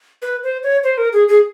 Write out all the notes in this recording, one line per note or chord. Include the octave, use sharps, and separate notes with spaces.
B4
C5
C#5
C5
A#4
G#4
G#4